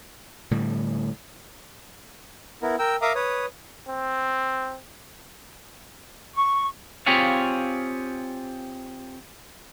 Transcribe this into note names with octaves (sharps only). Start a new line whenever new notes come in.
A2 D3 G3
B3 E4 A#4
A#4 G5 E6
A#4 E5 F5 A#5 D6 D#6
B4 C#5 D#6
C4
C#6
C4 F4 G4 G#4 C#5 F5